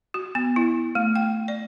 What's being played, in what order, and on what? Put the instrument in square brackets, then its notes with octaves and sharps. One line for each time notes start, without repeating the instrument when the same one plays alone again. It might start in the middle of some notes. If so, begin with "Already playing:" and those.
[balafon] F#4
B3
E4
A3
G5
D5